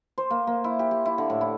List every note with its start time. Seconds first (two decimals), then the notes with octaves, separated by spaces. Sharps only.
0.18 C5
0.31 A#3
0.47 A#3
0.64 E4
0.79 G4
0.91 G4
1.06 E4
1.18 D3
1.30 A2
1.41 E4